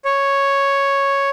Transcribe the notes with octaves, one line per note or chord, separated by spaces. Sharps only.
C#5